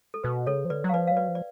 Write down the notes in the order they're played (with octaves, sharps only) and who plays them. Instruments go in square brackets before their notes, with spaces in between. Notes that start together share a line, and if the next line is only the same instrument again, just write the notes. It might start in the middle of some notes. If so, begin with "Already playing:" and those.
[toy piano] A4
[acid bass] B2 [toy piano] B4
[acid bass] C#3 [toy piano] A4 C#5
[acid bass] F3
[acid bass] D3 [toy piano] B4 D5
[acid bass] F#3
[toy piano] F5
[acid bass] F3 [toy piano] B4 D5
[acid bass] F#3 [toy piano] F5
[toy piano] B4 D5
[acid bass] F3
[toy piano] D5